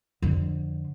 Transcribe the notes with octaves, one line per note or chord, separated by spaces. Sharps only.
F2 D3